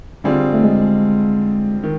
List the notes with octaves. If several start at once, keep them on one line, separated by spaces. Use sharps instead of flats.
D3 G3 C4 F4 G#4
A3
G#3
D#3